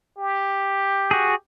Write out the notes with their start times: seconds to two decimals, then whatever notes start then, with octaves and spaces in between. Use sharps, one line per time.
0.18 G4
1.11 F#4 G#4